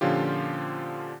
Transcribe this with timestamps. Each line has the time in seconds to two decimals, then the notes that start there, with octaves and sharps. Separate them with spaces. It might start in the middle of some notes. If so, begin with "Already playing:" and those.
0.01 A#2 D3 F3 C#4 F4 G4